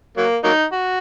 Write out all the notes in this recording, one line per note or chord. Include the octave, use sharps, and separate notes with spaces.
F#3 A#3
F#3 A#3 D#4
F#4